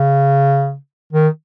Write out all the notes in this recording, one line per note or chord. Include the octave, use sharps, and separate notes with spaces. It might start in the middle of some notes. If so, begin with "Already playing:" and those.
Already playing: C#3
D#3